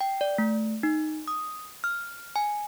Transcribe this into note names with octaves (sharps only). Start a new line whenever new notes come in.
G5
D5
A3
D#4
D#6
F6
G#5